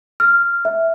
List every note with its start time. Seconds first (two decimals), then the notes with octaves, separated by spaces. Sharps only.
0.20 F6
0.65 E5